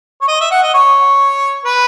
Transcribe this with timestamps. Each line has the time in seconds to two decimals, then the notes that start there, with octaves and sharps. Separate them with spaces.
0.21 C#5
0.28 D#5
0.40 E5
0.51 F#5
0.63 D#5
0.74 C#5
1.65 B4